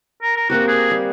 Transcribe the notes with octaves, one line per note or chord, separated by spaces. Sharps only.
A#4
A#4
A#3 C4 F#4 G4
G#4
G3